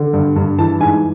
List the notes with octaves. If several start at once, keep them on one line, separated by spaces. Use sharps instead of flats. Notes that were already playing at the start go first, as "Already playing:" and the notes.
Already playing: D3
G2
G2
E3 A5
G#2 G#5